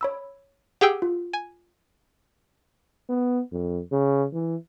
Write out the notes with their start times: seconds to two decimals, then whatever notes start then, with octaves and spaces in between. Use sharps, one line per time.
0.01 C#5 B5 E6
0.81 G4 G#4 F#5 G5 D6 E6
1.02 F4
1.33 G#5
3.09 B3
3.52 F2
3.92 C#3
4.33 E3